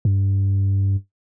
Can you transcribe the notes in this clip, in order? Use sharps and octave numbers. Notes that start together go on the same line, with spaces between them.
G2